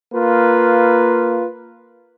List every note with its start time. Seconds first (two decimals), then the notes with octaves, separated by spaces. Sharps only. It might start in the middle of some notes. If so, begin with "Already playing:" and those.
0.13 A#3 F4 B4